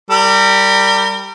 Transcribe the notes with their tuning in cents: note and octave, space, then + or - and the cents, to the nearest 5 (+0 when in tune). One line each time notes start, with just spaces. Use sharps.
G3 -5 A#4 -35